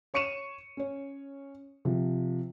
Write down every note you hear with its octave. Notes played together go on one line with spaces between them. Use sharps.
C#5 C#6 C#7 D#7 E7
C#4 C#5
C3 F3